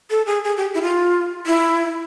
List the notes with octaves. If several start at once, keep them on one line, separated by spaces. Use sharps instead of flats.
A4
G#4
G#4
G4
E4
F4
E4